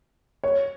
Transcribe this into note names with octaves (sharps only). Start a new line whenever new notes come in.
C#5